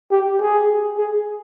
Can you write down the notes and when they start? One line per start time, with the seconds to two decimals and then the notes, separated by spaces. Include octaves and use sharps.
0.11 G4
0.40 G#4
0.98 G#4